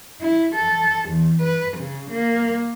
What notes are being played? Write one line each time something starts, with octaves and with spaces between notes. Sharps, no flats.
E4
A4
E2
B4
C#3
A#3